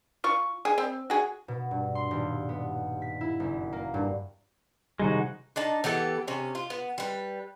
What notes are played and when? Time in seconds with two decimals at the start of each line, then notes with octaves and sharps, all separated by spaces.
0.24 F4 C#6
0.65 G#4
0.78 C4
1.10 F#4 G#4
1.48 B2
1.71 G2
1.95 C6
2.11 D#1
2.49 B3
3.02 B6
3.21 E4
3.40 F#1
3.73 A#3
3.94 G2
5.00 C3 D#3 G3 G#3 D#4 F#4
5.56 D4 D#4 A5
5.84 E3 B3 G4 A4
6.28 C3 C#4
6.55 F4
6.70 B3
6.98 G3 B4